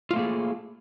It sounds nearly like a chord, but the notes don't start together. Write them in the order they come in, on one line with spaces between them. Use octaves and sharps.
F4 A3 A#3 G#4